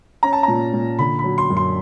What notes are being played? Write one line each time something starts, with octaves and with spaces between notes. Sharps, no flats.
C#4 A#5
A5
A#2 A#5
A#2
D3 B5
B5
F#3
C6
F#2
C6